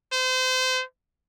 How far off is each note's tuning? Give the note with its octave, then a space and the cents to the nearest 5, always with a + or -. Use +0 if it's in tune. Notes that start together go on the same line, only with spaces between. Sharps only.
C5 -30